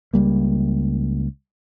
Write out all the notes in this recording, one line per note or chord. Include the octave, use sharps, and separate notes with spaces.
C#2 G3 A#3